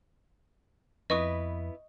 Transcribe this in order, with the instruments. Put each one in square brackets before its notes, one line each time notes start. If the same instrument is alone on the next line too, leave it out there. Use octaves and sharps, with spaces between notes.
[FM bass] F2 [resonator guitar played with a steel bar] B3 E4 B4 [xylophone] D#5 C#6 D#6